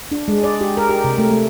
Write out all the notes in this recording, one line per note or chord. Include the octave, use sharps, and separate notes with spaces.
D4
G#3
D5
G4
A#4
G4
C3
A3
A3